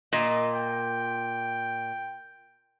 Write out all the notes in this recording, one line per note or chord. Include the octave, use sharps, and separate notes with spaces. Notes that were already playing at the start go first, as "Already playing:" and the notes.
A#2 D#5
G5